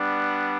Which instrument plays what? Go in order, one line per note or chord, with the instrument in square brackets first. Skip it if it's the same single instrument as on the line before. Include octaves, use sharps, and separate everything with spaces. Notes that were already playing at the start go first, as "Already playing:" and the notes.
Already playing: [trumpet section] G3 B3 D4